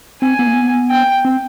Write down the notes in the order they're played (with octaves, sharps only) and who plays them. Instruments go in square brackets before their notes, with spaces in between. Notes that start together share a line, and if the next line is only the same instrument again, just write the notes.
[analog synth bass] C4 [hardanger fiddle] G#5
[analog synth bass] B3
A#3
B3
[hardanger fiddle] G5
[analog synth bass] C4